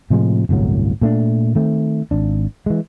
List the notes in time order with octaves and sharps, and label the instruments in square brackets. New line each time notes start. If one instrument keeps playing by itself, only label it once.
[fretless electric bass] A2 C3 F3 G#3
G1 C2 A2 F#3
A#2 A3 D4
D#3 A3 C4
G#1 D4
E3 G#3